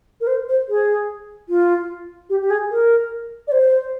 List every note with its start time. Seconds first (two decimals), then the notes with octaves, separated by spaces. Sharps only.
0.21 A#4
0.27 C5
0.49 C5
0.69 G#4
1.49 F4
2.30 G4
2.42 G4
2.50 G#4
2.71 A#4
3.47 D5
3.52 C5